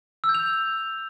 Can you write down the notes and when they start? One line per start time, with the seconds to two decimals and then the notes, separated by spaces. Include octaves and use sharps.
0.24 E6
0.29 G6
0.35 F7